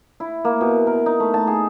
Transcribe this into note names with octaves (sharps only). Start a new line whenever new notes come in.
E4
A#3
B2
A#4
D#4
A3
A5
G#4